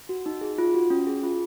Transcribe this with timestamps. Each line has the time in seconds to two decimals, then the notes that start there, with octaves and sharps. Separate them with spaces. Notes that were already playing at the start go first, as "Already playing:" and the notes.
0.09 F#4
0.26 D#4
0.41 G#4
0.58 F4
0.74 F#4
0.90 C#4
1.07 G#4
1.23 F4